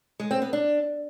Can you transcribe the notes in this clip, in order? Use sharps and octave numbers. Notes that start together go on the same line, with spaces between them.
G#3
C4
B3
D4